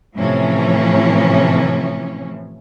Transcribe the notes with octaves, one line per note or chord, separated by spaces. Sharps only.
A2 C3 E3 F3 C#4